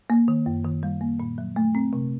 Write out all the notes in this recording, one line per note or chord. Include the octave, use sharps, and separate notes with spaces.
A#3
D#3
F#2
D#3
G3
A#3
A#2
F#3
A3
C4
C3